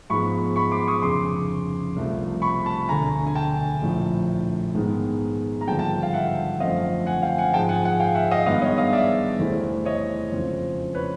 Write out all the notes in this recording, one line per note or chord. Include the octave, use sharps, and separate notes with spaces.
G#2 F3 G#3 B3 B5 C#6
B5 C#6
C6 D6
C#6 D#6
F1 F2 C#3 C6 D6
C2 C3 F3 A3
B5 C#6
A5 B5
E1 D2 D3 G#5 A#5
G#5
G5 A5
A#1 A2 F3
G#2 D#3 G#3 B3
A#5
G#1 G2 D3 F3 A#3 G5 A5
G5 A5
F5 G5
E5 F#5
F#2 D3 F3 A3 C4 D#5 F5
F#5 G#5
F5 G5
F#5 G#5
G#2 F3 G#3 G5 A5
F#5 G#5
F#5 G#5
F5 G5
E5 F#5
D#5 F5
G2 D#3 G#3 B3 D#5 F5
C#5 D#5
D#5 F5
D5 E5
E2 C3 E3 A3 C4
C#5 D#5
F2 C#3 F3 G#3 C4
B4 C#5